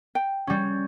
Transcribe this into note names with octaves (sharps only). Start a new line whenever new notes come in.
G5
G3 C#4